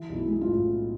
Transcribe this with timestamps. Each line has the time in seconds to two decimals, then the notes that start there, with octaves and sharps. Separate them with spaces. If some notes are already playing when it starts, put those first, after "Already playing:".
Already playing: E3
0.09 B1
0.16 E4
0.28 G#3
0.41 F4
0.47 A2